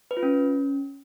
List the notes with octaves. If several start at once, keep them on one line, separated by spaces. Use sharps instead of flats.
B4
F4
C#4